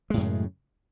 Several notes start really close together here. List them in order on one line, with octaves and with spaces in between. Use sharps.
G#3 A2 F#2 C#3